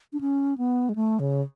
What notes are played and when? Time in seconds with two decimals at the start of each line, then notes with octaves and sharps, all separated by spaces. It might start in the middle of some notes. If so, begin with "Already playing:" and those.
0.13 D4
0.21 C#4
0.58 B3
0.89 G#3
0.95 A3
1.20 C#3